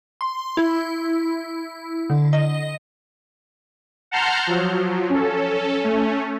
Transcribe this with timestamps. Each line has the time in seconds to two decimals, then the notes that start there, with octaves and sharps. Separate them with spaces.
0.21 C6
0.57 E4
2.10 D3
2.33 D#5
4.11 F#5 A5 A#5 C6 F6 G6
4.47 F3 F#3
5.09 C#4 A4
5.80 A3 C#4